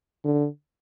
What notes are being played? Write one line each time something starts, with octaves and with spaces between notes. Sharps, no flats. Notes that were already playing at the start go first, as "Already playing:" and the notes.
D3